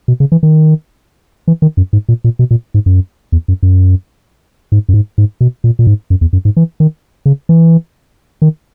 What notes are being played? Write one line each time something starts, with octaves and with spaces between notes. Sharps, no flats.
B2
C#3
E3
D#3
E3
D#3
F#2
G#2
A#2
A#2
B2
A#2
G#2
F#2
E2
F#2
F#2
G#2
F#2
G#2
G#2
B2
A#2
A#2
G#2
F#2
E2
F#2
G#2
E3
D#3
C#3
E3
D#3